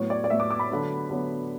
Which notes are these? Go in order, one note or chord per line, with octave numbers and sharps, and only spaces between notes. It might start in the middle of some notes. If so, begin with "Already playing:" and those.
Already playing: A2 F#3 B3 C#5
D5
D5
A2 F#3 B3 E5
D6
D6
B5
D3 F#3 B3
D3 F#3 B3